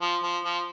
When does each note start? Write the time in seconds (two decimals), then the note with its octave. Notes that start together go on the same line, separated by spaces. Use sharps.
0.01 F3
0.23 F3
0.44 F3